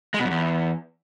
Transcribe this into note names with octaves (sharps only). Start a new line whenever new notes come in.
G#3
B2
F#2
E2